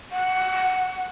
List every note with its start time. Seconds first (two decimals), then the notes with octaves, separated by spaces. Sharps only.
0.11 F#5